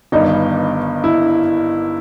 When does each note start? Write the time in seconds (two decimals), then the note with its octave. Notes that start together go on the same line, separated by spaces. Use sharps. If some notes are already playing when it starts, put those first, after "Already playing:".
0.12 G1 G2 D#3 G3 D#4
1.04 E4